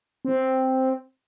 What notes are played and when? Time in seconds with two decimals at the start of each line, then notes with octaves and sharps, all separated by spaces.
0.25 C4